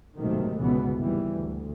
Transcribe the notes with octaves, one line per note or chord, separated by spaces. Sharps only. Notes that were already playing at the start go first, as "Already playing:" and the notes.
F#1 B1 G#2 C3 D#3 A3
G1 C#2 G#2 B2 E3 B3
D#2 E3 G3
D2